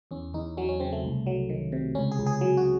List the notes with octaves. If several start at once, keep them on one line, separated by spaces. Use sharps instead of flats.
E2 C#4
E2 D#4
F#3 C#4
C#4
C#3 C4
A3
C2
F#3
D#3
C3
C#2 C#4
G#4
C#2
G#4
F#3
F#4